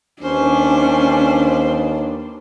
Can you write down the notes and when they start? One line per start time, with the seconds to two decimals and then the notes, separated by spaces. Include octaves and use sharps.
0.23 D#2 C#4 D4 B4 C5